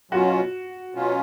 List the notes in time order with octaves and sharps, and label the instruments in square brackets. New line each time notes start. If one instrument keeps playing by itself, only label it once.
[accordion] B2 F#3 C#4 F4 [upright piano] F#4
[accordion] B2 F#3 C#4 F4